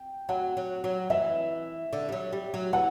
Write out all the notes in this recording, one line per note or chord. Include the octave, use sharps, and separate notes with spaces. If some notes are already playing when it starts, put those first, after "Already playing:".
Already playing: G5
F#3 F#5
F#3
F#3
E3 E5
D3
G3
F#3
G3
F#3
E3 F#5